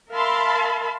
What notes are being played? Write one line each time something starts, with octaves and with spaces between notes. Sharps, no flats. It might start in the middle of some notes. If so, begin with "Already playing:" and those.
A#4 E5 F5 A5 B5 C6